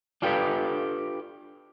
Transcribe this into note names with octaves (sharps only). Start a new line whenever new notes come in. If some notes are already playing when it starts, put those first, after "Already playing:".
D4 F4 G4 A4 B4